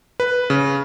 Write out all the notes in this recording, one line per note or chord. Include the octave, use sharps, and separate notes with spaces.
B4
C#3